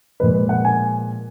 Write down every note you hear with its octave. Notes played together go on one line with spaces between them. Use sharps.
A#2 F3 G#3 B4
B4
F#5
G#5